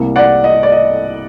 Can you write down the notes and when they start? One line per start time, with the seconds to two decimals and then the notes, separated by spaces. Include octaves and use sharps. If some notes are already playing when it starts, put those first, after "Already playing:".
Already playing: C2 C3 G3 A#3
0.16 D5 F#5
0.44 D#5
0.63 D5
0.72 D#5